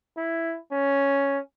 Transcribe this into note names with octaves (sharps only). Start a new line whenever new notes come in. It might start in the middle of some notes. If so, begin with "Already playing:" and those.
E4
C#4